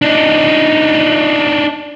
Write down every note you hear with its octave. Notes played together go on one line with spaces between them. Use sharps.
D4 D#4